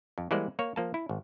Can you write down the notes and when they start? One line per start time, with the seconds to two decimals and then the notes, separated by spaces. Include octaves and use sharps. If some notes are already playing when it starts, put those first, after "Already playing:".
0.18 F2
0.31 E3 G3 G#3 A#3 C5 D5
0.59 A#3 C#5
0.76 F3 A#3 A5
0.94 E4
1.09 G#1